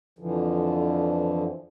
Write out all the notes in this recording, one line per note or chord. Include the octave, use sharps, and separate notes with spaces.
F2 D3 E3 F3